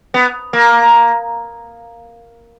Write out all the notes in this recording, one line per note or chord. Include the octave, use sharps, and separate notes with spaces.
B3
A#3